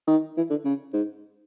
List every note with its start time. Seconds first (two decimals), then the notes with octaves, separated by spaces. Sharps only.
0.07 D#3
0.37 E3
0.50 D3
0.65 C#3
0.93 G#2